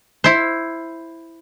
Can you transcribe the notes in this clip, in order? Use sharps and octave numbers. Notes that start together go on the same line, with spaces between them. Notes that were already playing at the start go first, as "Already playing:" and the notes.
E4 C5